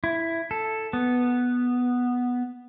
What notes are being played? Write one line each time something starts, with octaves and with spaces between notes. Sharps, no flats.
E4
A4
B3